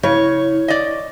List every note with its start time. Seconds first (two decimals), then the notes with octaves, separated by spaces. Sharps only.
0.03 C#3 E4 C#5
0.68 D5 D#5